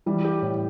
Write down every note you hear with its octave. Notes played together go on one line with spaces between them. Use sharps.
E3 G3
G4
A2